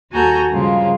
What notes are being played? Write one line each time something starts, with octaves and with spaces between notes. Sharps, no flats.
D#2 F#4 A4 G#5 A#5 G6
G2 C#3 F3 G#3 A#3 F4